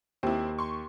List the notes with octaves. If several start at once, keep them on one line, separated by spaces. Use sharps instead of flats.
D#2 C4 E4
C6 C#6